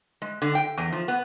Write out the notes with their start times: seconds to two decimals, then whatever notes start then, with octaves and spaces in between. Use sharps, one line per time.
0.22 G#3
0.42 D3
0.55 G5
0.77 E2
0.92 F3
1.08 B3